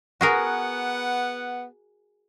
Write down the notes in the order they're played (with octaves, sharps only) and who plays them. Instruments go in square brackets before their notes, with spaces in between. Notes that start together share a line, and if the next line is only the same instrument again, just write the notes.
[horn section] B3 F#5 [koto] F#4 G#4 A#4